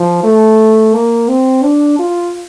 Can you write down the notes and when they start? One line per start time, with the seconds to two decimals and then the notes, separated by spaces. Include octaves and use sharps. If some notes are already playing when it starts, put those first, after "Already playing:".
Already playing: F3
0.24 A3
0.94 A#3
1.29 C4
1.63 D4
1.99 F4